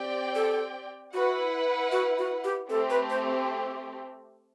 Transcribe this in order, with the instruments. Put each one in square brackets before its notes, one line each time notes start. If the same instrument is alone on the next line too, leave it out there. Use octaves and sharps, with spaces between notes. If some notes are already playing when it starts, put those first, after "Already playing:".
Already playing: [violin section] C4 G4 D5 G5
[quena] A4
[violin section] E4 B4 F#5 [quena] F#4
[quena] F#4
F#4
G4
[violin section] A3 C4 G4 [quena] A4
[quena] B4
C5